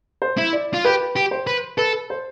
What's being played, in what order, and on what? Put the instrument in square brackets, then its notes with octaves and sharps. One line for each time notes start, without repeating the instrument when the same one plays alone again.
[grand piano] C5
[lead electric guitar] E4
[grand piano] D5
[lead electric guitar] F4
[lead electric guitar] G4 [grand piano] B4
[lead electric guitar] G4
[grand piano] C5
[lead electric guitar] B4
[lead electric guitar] A4 [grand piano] B4
[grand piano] C5